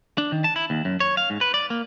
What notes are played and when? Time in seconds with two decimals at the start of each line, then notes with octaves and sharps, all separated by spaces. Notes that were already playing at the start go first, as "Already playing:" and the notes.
0.18 D4
0.32 D#3
0.44 A5
0.56 E4
0.70 D#2
0.85 F#2
1.00 C#5
1.17 F5
1.30 G#2
1.41 B4
1.54 D5
1.70 A#3